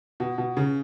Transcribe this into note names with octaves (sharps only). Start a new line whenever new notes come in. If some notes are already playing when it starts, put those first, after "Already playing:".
B2
B2
C#3